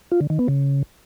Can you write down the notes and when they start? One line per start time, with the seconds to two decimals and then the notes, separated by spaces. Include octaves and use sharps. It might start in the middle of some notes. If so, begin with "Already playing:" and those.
0.12 F4
0.21 D3
0.30 D#3
0.39 B3
0.48 C#3